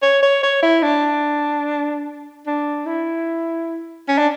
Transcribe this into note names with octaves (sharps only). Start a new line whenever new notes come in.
C#5
C#5
C#5
E4
D4
D4
E4
C#4
D4